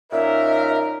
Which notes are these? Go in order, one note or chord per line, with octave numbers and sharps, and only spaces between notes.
A#2 C#4 D#4 A#4 E5